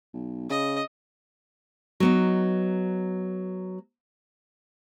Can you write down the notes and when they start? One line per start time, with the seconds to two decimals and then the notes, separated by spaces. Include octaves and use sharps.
0.14 B1
0.50 C#3 D#5
2.00 F#3 B3 D#4